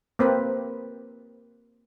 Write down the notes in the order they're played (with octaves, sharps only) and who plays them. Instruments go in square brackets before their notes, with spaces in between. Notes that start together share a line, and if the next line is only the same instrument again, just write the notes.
[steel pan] A#3 C4 B4